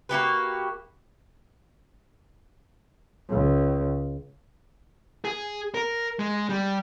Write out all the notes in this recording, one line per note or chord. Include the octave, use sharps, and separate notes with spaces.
A#3 F#4 G4 B4
C#2
G#4
A#4
G#3
G3